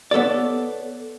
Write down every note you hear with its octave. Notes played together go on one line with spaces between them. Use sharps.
B3 A4 C#5 D5